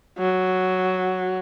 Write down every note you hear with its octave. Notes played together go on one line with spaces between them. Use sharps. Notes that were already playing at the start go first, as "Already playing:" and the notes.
F#3